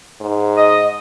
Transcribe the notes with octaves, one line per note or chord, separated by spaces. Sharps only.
G#2
D#5